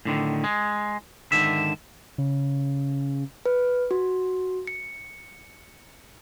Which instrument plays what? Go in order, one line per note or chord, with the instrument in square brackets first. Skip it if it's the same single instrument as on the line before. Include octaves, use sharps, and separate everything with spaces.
[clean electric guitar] A2 D3 D#3
G#3
G#2 D3 D#3 E5
[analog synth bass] C#3
[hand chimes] B4
F#4
C#7